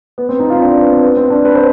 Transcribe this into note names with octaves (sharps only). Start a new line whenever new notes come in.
B3
C4
D#4
F4
C4
D4
D4
B3
C4
B3
C4
D4
B4
C5